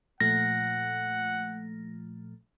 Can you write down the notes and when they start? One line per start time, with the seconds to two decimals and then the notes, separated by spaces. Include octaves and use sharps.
0.20 A#2 F3 A3 F#5 A#6